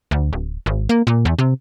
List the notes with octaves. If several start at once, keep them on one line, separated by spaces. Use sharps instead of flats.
D2
D1
G#1
A#3
A#2
E2
C3